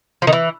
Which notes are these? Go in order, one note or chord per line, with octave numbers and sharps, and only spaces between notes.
F3
D#3
E3